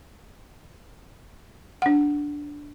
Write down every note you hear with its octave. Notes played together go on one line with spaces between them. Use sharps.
D4 F#5